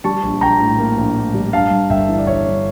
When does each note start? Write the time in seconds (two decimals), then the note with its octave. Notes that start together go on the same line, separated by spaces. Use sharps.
0.04 G3 A5 C#6
0.23 A#1
0.41 A#1 G5 A#5
0.60 A2
0.78 A#3
0.97 A#1
1.16 A2
1.34 G3
1.53 G2 F5 A5
1.71 G2
1.89 G1 E5 G5
2.09 E3
2.18 D5
2.27 G1 C#5
2.46 G2